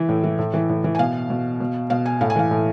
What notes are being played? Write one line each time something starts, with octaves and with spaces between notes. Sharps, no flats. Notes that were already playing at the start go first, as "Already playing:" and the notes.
Already playing: E3 E5
A2
E3
A2
E3
A2
E3
G#5
B2 F5
B2
B2
B2 F5
G#5
A2 F5
G#5
E3 F5
A2